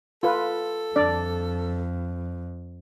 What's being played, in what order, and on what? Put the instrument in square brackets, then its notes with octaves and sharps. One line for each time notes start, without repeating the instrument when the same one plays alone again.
[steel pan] F4 B4 [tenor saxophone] A4
[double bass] F2 [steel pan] D4 D5